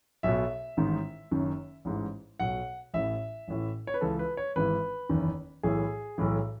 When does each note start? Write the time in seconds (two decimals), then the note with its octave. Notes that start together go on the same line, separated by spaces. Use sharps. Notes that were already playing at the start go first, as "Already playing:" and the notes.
0.23 B1 B2 E5
0.77 A1 G#2 D#3
1.31 F#1 F#2 D#3
1.85 A1 G#2 E3
2.40 B1 B2 F#5
2.94 A1 A2 E3 E5
3.48 A1 A2 E3
3.87 C#5
3.94 B4
4.01 C#2 C#3 E3 A4
4.19 B4
4.37 C#5
4.56 G#1 G#2 E3 B4
5.09 F#1 E2 D#3
5.63 B1 A2 E3 G#4
6.18 B1 A2 E3